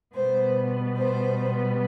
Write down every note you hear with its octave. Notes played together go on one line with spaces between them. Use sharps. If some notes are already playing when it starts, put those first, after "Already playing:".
B2 G3 B3 C5
C5